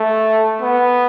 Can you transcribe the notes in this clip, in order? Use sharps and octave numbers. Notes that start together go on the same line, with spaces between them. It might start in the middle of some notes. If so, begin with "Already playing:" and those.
Already playing: A3
B3